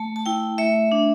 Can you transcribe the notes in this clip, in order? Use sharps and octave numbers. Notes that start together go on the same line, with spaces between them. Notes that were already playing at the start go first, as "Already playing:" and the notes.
Already playing: A3 A5
A5
E4 G5
A3 E5
D4